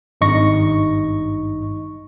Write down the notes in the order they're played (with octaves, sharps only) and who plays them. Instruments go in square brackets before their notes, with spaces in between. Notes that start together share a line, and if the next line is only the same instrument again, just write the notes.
[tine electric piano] G#1 G2 D#4 D#5 C#6 A#6